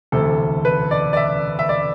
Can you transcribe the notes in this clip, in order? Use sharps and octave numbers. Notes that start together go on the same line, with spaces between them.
E1 D2 C3 A4
B4
D5
D5
E5
E5
D5